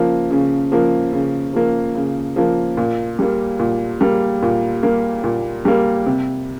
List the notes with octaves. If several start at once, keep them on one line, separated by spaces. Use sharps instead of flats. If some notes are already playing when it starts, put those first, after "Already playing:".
Already playing: C#3 F3 A#3
C#3
F3 A#3
C#3
F3 A#3
C#3
F3 A#3
A#2
G3 A#3
A#2
G3 A#3
A#2
G3 A#3
A#2
G3 A#3
C3